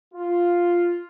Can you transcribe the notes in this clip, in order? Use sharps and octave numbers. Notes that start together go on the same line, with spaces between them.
F4